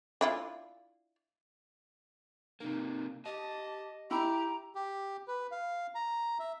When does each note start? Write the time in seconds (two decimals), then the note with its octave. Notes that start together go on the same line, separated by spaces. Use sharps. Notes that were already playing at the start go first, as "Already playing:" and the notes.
0.21 D4 E4 F4
2.60 C3 A#3 D#4
3.26 G4 D#5 A5
4.11 E4 G4 A#5
4.75 G4
5.28 B4
5.51 F5
5.95 A#5
6.39 E5